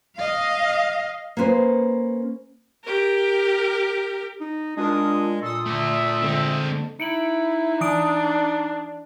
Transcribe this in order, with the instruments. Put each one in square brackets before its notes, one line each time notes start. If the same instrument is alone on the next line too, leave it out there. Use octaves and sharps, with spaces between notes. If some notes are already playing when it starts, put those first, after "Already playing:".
[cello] D#5 F5
[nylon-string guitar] A#3 C#4 B4 C5
[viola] G4 A#4
[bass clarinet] D#4
[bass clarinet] G#3 [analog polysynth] D4 F4 A#4 [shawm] D#6
[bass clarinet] A#2 [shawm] A4 [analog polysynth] C6 D#6
[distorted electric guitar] A3 D5 [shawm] E5
[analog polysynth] D3 G#3 A4 [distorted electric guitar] C4 D#5
[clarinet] D#4 [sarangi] E4 [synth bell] C#7 D7 F#7
[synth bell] E3 D#6 D7 [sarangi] D4